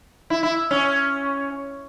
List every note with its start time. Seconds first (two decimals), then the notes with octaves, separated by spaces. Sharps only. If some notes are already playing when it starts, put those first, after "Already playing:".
0.30 E4
0.43 E4
0.71 C#4